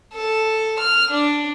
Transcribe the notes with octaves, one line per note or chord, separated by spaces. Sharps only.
A4
F6
D4